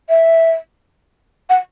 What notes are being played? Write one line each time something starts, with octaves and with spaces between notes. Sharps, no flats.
E5
F#5